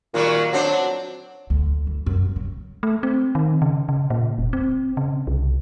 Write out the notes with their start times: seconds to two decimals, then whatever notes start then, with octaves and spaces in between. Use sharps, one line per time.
0.14 A#2 D#3 F#3 G3
0.53 F#3 C4 D4 C5
1.50 D2
1.87 E3
2.06 F#2
2.36 C#3
2.83 A3
3.03 C4
3.35 D#3
3.62 C#3
3.89 C#3
4.10 A#2
4.38 F1
4.53 C4
4.97 C#3
5.27 C2